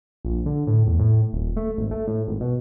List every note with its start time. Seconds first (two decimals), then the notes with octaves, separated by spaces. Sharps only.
0.25 A#1
0.46 D3
0.67 A2
0.87 E2
0.99 A2
1.33 D#1
1.57 A3
1.77 G#1
1.91 A3
2.07 A2
2.27 G#1
2.40 B2